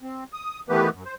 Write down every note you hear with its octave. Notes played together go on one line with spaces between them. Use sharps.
C4
D#6
D#3 E3 A3 B3 G4 B4
F#2
C5